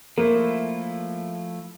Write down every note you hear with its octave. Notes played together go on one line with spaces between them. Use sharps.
F3 A3 A#3 E4